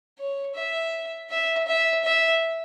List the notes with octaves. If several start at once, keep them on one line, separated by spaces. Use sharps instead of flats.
C#5
E5
E5
E5
E5